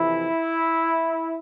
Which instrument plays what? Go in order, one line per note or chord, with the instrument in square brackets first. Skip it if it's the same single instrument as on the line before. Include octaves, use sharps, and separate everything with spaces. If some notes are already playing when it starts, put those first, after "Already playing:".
Already playing: [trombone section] F2 C3 E3 E4